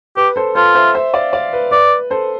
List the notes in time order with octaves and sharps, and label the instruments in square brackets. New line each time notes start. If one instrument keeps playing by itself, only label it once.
[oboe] G4 [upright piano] B4
[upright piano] A4 C5
[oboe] F4 [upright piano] A4 C5
[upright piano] C5 E5
C5 E5
D5 F5
D5 F5
B4
[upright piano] B4 [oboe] D5
[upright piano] A4 C5